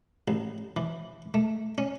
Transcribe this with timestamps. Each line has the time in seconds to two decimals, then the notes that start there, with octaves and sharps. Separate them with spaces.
0.28 A1
0.77 E3
1.34 A3
1.78 C#4